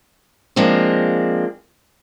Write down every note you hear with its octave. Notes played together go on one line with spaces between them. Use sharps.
F3 G#3 A#3 C4 D4